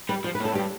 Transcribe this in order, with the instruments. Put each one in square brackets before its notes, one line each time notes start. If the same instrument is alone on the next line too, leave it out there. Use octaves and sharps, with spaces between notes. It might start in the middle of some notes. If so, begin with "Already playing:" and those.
[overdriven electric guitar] G3 [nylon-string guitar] B4
[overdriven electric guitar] F3 [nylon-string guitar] C5
[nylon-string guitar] B4
[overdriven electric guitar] A2
[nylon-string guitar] A4
[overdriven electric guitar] G2 [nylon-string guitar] G4